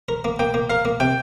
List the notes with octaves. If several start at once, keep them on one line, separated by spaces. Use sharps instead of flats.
A#4
A#3
A#3 G5
A#3
A#4 F5
A#3
C3 G5